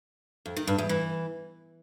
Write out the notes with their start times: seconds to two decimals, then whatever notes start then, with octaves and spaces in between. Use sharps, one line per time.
0.46 F2
0.57 D#3
0.67 G2
0.78 E2
0.89 E3